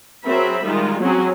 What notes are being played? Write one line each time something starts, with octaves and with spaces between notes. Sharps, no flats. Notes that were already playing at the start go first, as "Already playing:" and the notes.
F#3 C4 G#4 A#4 E5 B5
D#3 G3 G#3 F4
F#3 G#3 C4 C#4 G#4